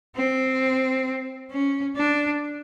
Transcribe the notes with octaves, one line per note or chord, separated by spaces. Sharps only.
C4
C#4
D4